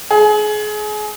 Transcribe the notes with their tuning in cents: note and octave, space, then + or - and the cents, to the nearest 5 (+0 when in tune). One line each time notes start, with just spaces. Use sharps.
G#4 +30